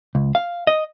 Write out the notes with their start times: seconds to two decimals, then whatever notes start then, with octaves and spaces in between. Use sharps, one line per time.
0.15 C#2
0.35 F5
0.67 D#5